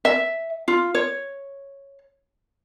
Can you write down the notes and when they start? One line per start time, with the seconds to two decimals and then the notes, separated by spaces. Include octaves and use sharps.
0.05 E5
0.68 F4
0.95 C#5